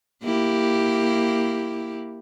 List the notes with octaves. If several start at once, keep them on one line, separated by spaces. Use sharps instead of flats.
A#3 E4 G4